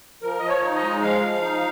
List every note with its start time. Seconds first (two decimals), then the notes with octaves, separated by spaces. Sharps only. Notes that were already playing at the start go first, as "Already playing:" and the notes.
0.22 F3 A#4
0.38 F3 D#5
0.48 C#5
0.62 D#4
0.75 D#5
0.82 G#3
1.02 F3 F5
1.22 F3
1.42 D#4